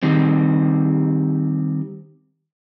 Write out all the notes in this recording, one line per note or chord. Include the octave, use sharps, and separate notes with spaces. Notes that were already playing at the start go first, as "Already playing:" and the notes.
D#3 G3 C4